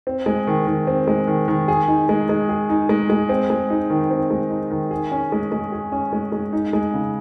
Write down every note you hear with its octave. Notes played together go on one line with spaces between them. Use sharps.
C4
G#3
D#3
D#3
C4
G#3
D#3
D#3
G#4
D#4
G#3
G#3
G#4
D#4
G#3
G#3
C4
G#3
D#4
D#3
C4
G#3
D#4
D#3
G#4
C#4
G#3
G#3
G#4
C#4
G#3
G#3
D#4
G#3
C#3